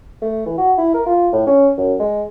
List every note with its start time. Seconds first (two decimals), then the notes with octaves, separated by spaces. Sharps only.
0.22 A3
0.46 E3
0.58 F#4
0.78 E4
0.94 A#4
1.06 F4
1.33 A2
1.47 C#4
1.78 F#2
2.00 G#3